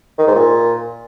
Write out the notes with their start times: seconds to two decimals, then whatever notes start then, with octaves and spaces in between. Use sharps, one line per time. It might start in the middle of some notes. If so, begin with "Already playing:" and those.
0.18 D#3
0.27 G#2
0.35 A#2